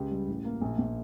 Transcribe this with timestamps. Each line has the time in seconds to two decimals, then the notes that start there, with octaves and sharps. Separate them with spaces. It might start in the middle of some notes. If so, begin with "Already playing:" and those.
Already playing: C#2 G4
0.11 G3
0.28 A1
0.45 A#3
0.61 A#1
0.78 A#1